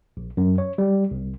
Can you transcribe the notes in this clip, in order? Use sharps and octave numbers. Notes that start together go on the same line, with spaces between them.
A#1
F#2
C#5
G3
C2